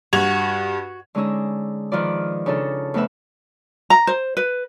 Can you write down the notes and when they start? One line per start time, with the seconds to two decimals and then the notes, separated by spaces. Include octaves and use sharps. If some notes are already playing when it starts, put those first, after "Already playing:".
0.13 G2 F#4 G#6 F7
1.15 D3 G#3 C#4 D#4 G#4 E6
1.92 D#3 F3 F4 B4 D5
2.46 C#3 D4 D#4 F4 A4
2.94 F2 A3 B3 B4 E5
3.90 A#5
4.07 C5
4.37 B4